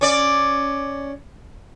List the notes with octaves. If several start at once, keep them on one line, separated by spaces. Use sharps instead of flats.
C#4 D5